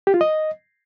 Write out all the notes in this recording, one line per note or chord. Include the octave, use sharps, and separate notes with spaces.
G4
F4
D#5